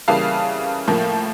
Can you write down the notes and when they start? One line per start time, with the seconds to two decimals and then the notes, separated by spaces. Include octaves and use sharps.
0.08 C#3 E3 G3 A#3 F5 A5
0.88 A2 F3 A#3